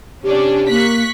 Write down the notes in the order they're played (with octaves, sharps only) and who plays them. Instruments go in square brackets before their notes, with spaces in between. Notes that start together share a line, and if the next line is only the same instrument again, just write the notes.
[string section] C3 C#4 D4 [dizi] G4
[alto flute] A#3 [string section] C#6 F#6 B6